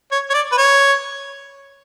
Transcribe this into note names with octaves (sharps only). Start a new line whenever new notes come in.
C#5
C#5
D5
B4
C#5